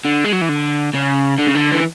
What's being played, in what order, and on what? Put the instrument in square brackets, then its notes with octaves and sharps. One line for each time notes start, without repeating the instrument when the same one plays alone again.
[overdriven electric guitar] D3
G#3
F#3
E3
D3
C#3
D3
C#3
D3
E3